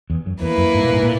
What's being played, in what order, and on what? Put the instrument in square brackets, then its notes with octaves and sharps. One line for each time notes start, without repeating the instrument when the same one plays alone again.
[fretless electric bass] E2
F#2
[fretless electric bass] E2 [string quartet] A#3 E4 B4
[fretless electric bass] F#2
G#2
A#2
G#2
A#2